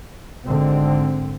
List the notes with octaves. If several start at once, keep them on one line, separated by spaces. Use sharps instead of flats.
G#1 G#2 D3 C4